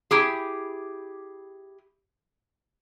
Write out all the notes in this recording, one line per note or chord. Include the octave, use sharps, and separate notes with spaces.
E4 G4 G#4